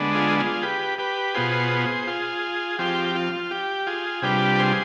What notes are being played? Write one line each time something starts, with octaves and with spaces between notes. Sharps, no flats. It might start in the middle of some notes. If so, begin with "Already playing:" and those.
Already playing: D3 G#3 B3 D4
F4 G#4
F4 G#4
G4 B4
G4 B4
B2 B3 F4 G#4 C5
F4 G#4
F3 C4 F4 G4
F4
G4
F4 G#4
C3 G3 D4 F4 G4 B4
G#4 C5